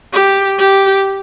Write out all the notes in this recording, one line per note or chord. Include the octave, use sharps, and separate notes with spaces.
G4
G4